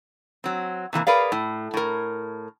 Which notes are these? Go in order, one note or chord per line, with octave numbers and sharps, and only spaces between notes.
F#3 C4
C3 E3 G3 A#3
G#4 A#4 B4 D5 F5
A2
A2 A#4